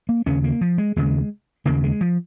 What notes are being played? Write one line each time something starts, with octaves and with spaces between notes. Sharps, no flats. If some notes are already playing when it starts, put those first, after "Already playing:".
A#3
D#2 C#3 C#4
A#3
F3
G#3
D#2 C#3 G#3
D#2 C#3 A#3
G#3
F3